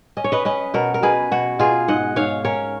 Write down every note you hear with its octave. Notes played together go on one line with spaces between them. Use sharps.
C#4 D#5
C#5
B4 D#5
C#4 B4 D#5
B2 F#4 A#4
A#4
B2 G#4 B4
B2 F#4
B2 F4 G#4
G#2 D#5 F#5
G#2 C#5 F5
C#4 A#4 C#5